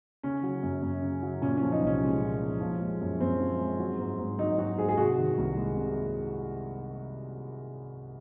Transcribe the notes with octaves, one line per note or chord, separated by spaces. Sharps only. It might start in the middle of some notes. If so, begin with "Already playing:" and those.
C#3 C#4
F#3
F#2
F#2
C#3
F#3
A#2 C#4
F3 C#4
D#4
C2
C#4
G#3
A#2
F3
F3
G#3
F#2
F#2 C4
F3
G#3
F#3
G#2
G#2
F#3 D#4
F#3 F#4
G#2 G#4
G#4
C3 F#4
D#3
C2
G#3
C3